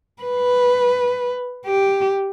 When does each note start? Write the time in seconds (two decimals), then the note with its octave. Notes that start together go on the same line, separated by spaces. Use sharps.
0.22 B4
1.66 G4